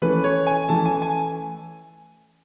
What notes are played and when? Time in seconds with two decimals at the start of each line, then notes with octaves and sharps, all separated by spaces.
0.02 E3 A3 C#4 B4
0.24 C#5
0.47 G#5
0.68 E3 A3 C#4 A5
0.86 G#5
1.02 G#5